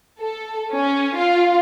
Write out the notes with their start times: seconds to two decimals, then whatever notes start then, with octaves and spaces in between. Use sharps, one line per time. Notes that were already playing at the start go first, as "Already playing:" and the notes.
0.20 A4
0.74 C#4
1.17 F4